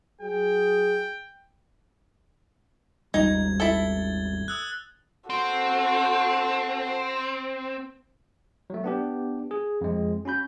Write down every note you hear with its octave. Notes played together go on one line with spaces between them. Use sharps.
F#3 G#4 G5
G#1 D#2 G3 D#4 A#5 G#6
E4 A4 A6 G7
D#6 E6 F#6
C4 F#4 A4
F#3 A3
B3 D4 G4
G#4
F2 G#3
C#4 F#4 B5 G6